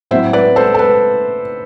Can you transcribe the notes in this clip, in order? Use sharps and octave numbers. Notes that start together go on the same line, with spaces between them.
A2 F#3 C4 E4 C5 E5
B4 D5
A4 C5
A4
B4